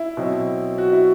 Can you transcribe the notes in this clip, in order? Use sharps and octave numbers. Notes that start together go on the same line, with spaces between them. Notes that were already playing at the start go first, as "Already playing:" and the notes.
Already playing: E4
B2 F#3 C4
F#4
E4